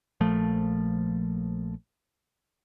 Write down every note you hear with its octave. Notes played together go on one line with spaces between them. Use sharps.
A#1 F3 A3